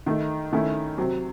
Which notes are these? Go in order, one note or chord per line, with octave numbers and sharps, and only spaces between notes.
D#3 A3 D#4
D#3 A3 C#4 E4
C3 F#3 C4